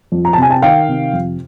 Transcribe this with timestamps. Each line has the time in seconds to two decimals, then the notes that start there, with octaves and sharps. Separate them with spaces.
0.12 F2
0.25 A#5
0.33 A5
0.38 C3 G#5
0.50 G5 A5
0.62 D#3 F5 G5
0.88 C3
1.13 F2